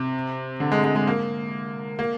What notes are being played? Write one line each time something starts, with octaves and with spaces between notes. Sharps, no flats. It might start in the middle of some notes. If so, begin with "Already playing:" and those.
Already playing: C3
D3
G#3
G#3
G#3
A#3
A#3